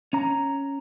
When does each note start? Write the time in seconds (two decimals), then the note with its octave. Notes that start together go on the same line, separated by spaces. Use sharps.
0.13 C#4 A#5